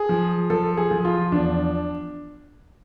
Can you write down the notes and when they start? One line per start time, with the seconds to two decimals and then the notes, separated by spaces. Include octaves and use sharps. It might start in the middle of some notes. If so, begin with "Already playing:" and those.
Already playing: G#4
0.09 F3
0.50 F3 A4
0.77 G#4
0.91 F3
1.05 F4
1.32 E2 D4